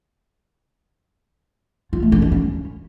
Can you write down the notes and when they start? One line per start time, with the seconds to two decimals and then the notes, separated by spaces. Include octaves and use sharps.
1.93 F4
2.02 A3
2.12 C#4
2.22 D4
2.32 C#4